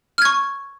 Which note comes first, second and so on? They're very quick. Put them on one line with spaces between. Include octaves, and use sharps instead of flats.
F6 G#6 C#6